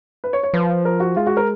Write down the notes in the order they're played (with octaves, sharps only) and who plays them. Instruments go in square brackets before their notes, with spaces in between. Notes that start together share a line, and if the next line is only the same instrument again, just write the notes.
[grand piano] B4
C#5
C#5
[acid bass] F3 [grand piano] B4
[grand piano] A#4
F#4
[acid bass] G#3 [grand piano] F4
[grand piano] F#4
A#4